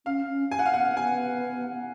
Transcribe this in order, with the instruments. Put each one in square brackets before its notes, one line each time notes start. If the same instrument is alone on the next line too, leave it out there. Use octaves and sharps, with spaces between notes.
[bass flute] C#4 [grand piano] F5
[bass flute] C#4
[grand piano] G#5
F#5
F5
[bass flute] B3 [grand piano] F#5
[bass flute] B3 [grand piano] G#5